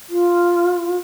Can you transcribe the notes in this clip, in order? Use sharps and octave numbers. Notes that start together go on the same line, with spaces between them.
F4